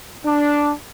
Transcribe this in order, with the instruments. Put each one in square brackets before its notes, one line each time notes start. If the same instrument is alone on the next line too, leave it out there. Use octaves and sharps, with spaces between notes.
[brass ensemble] D4